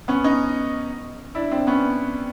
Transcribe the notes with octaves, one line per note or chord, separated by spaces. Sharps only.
B3 C#4
C#4 D#4
D4 E4
C4 D4
B3 C#4